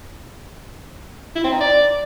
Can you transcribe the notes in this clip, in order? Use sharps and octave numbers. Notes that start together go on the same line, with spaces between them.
E4
C4
D#4
D5